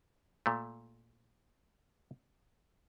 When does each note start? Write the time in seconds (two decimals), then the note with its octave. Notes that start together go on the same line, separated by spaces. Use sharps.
0.46 A#2 A3